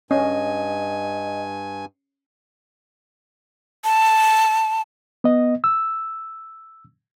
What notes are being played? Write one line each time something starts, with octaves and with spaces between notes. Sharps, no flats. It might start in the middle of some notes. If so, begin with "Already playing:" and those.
G2 C#4 D#5 G#5
A5
B3 D#5
E6